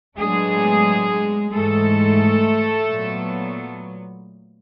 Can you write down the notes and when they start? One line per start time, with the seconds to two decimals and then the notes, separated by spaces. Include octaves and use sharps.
0.17 A2 F#3 G#3 B3 D4 G#4
1.52 G#2 E3 G#3 A3 A4
2.87 A#2 F#3 B3